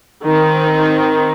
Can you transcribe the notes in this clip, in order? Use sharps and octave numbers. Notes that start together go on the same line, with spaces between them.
D#3 C4